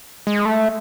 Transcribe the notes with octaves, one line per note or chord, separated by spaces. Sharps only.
G#3
A3